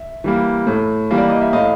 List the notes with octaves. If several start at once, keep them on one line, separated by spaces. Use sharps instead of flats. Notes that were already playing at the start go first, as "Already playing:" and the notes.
Already playing: E5
E3 G3 A#3
A2
E3 G3 A#3
D5
D#5
E5
A2 D#5 F5